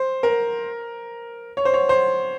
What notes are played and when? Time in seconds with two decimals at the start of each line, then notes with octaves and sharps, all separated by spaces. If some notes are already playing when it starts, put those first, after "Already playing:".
Already playing: C5
0.23 A#4
1.57 C#5
1.65 C5
1.74 C#5
1.89 C5